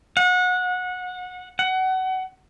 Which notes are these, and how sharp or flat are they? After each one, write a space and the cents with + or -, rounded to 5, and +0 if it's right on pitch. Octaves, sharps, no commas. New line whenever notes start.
F#5 -25
F#5 +25